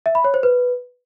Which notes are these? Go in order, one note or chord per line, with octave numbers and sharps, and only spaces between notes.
E5
B5
C#5
C5
B4